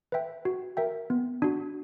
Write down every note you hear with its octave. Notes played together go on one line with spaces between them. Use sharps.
B4 E5 G5
F#4
A#4 E5 G5
B3
D4 F#4